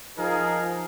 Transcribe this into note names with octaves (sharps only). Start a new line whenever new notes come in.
F3 D#4 G#4 A#4